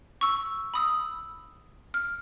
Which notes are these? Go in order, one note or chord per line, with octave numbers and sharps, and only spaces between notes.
C#6 E6
B5 D#6 E6
F6